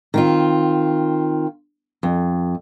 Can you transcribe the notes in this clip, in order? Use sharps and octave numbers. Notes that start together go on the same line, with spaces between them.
D#3 C4 F4
F2